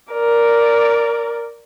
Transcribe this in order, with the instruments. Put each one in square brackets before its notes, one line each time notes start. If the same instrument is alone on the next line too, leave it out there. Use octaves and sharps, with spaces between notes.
[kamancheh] A#4 D5